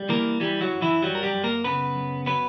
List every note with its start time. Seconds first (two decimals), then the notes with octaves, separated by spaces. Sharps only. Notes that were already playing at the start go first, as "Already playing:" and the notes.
Already playing: G3
0.09 E3 A#3 A#4
0.40 E3 G3 G4
0.61 F#3 F#4
0.72 F#2
0.81 E3 E4
1.02 F#3 G3 F#4
1.15 A#4
1.23 G3 G4
1.33 F#2
1.43 A#3 A#4
1.64 C#3 B3 B4
1.95 F#2
2.26 F#3 B3 B4